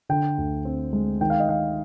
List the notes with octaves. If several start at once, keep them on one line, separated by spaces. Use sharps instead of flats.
D3 G5
D2
C4
G#3
D#3 G5
F5
D#5
D#3 F5